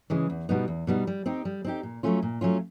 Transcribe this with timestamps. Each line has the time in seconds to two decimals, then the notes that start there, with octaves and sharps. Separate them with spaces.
0.10 C#3 E3 G#3
0.30 E2
0.49 B2 G3 B3 D#4
0.68 E2
0.87 B2 G3 B3 D#4
1.07 G3
1.26 C4 D#4 G4
1.45 G3
1.64 C4 D#4 G4
1.83 A#2
2.03 F#3 A3 C#4 F4
2.23 A#2
2.41 F#3 A3 C#4 F4